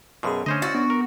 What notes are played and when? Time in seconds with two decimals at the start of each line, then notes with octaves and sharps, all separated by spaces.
0.23 F#2 B2 G#4 F5 C6
0.46 D3 A3 C#4 C5 D#5
0.62 E4 F#4 C#6 E6 A6
0.75 B3 D4
0.90 A#4